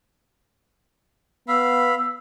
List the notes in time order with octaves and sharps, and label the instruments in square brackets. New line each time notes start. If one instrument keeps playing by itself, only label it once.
[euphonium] B3 [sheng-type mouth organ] F5 B5 [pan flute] E6